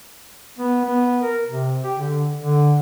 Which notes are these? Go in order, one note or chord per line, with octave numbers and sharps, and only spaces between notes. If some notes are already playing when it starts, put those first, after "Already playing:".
B3
B3
A#4
C3
G4
D3
D3